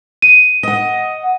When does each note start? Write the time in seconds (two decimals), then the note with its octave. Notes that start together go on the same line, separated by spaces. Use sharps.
0.22 D#7
0.63 D#5 F#5